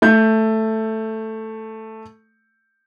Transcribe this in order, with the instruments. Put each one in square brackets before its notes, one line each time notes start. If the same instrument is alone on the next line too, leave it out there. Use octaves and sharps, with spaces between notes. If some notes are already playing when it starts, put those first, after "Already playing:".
[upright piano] A3 G6